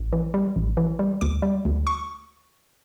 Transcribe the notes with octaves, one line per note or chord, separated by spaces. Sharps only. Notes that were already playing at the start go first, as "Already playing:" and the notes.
Already playing: A1
E3
G3
A1
E3
G3
D2 D6
G3
D2
C#6